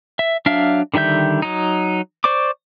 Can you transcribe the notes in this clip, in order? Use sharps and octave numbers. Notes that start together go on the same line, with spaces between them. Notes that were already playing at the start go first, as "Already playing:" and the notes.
E5
F#3 D4 E5 F5 F6
D3 D#3 G3 E5 G6
F#3 D#4
C5 D5 C#6 D6